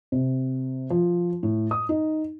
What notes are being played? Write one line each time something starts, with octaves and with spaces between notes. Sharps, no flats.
C3
F3
A2
D#6
D#4